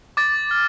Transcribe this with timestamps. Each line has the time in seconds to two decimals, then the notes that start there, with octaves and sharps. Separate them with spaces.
0.17 D6 A6
0.51 F6